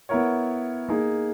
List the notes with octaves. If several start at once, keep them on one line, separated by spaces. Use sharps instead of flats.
B3 E4 A#4 C#5
A#3 D#4 G#4